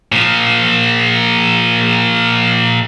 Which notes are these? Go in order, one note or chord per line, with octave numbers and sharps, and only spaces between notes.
A#2 F3